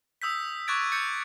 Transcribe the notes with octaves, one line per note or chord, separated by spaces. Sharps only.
D#6 E6 G6 B6
C#6 D6 F#6 G#6 A6 D7
G6 A6 C#7